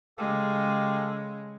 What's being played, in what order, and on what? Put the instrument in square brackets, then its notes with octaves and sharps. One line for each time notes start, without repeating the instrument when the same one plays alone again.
[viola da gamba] C#3 G#3 [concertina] G4 A4 F5